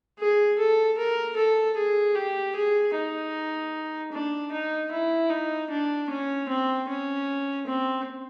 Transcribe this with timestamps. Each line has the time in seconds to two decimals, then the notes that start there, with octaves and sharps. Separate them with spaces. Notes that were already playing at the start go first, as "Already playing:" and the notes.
0.19 G#4
0.59 A4
0.98 A#4
1.37 A4
1.77 G#4
2.15 G4
2.55 G#4
2.95 D#4
4.13 D4
4.52 D#4
4.92 E4
5.30 D#4
5.70 D4
6.10 C#4
6.49 C4
6.89 C#4
7.67 C4